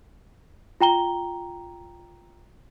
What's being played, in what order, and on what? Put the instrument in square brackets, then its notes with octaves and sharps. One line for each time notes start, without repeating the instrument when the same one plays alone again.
[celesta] F4 G5 A#5 G7